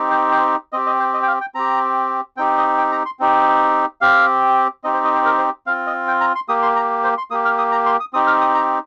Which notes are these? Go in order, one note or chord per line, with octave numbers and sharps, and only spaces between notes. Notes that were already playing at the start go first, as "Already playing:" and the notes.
Already playing: C4 D#4 G4
C5
C5
C4 G4 D#5
D#5
C5
D#5
G5
F5
G5
C4 G4 A#5
C4 D#4 G4 G5
D#5
G5
A#5
C6
C4 D#4 G4
C4 G4 F5
C4 D#4 G4 D#5
C5
D#5
C5
A#4
C5
C4 F4 F5
D#5
G5
A#5
C6
A#3 G4 D#6
C6
A#5
C5
C6
A#3 G4 D#6
F6
D#6
A#5
C6
D#6
C4 D#4 G4 D#6
F6
D#6
A#5